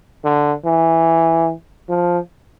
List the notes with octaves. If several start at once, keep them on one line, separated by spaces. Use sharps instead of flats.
D3
E3
F3